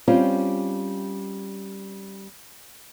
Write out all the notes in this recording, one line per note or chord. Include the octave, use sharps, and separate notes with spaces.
G3 C4 C#4 F4